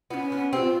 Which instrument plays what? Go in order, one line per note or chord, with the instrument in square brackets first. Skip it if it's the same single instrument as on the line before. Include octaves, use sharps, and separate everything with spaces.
[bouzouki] B3 [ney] C#4 F4
[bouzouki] B3
[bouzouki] C4 [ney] F4 G4